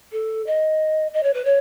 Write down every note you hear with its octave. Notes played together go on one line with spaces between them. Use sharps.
A4
D#5
D#5
C#5
B4
C#5